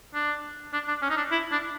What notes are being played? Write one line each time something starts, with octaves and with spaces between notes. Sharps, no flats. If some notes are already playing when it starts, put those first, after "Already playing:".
D4
D4
D4
C#4
D#4
D4
E4
D4